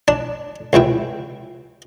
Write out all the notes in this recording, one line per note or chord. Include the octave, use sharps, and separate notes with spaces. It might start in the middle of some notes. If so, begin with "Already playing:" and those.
D4 A5
C#2 C3 E4 G5